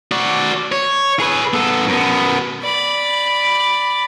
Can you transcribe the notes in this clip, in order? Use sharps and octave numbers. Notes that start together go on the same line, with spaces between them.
F#4 D5
C#5
G#4 B4
B3 A4
F#2 B3
D5 B5